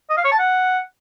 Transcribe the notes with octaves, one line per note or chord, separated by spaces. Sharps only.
D#5
F5
C#5
A5
F#5